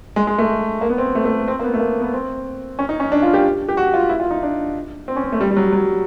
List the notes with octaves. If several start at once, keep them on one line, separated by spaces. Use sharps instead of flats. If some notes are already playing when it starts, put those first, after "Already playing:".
G#3
G#3
A3
A#3
B3
C4
A3
A3
C4
A#3
B3
A3
A#3
B3
C4
C#4
D#4
C#4
D4
F4
G4
G4
F#4
F4
E4
F4
D#4
D4
C4
C#4
C4
A3
G3
G3
F#3
F#3